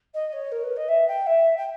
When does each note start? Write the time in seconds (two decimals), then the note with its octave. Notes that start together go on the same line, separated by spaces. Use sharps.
0.14 D#5
0.32 C#5
0.51 A#4
0.63 B4
0.76 D#5
0.88 E5
1.07 G5
1.26 E5
1.57 G5